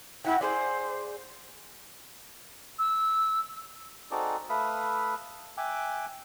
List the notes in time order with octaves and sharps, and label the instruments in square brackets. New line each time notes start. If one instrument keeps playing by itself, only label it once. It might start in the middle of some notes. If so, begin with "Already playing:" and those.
[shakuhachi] E4 [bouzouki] F#4 F#5 G5
[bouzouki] G#4 D5 [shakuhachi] C5
[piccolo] E6
[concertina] C4 D#4 F#4 G#4 A4 D5
A3 B4 E5 F5 B5 D#6
E5 G5 G#5 D6 F#6